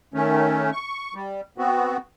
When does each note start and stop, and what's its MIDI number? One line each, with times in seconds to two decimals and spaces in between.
0.14 0.70 51
0.14 0.70 57
0.14 0.70 61
0.72 1.14 85
1.15 1.41 55
1.58 1.97 59
1.58 1.97 60
1.58 1.97 66